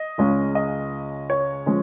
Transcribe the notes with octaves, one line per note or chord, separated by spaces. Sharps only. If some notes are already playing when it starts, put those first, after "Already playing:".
Already playing: D#5
C#2 C#3 G#3 C#4
D#5
C#5
F3 G#3 C#4